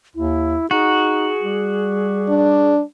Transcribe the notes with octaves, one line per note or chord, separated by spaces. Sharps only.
D#2 E4
D#4 F#4 G#4
G3
D4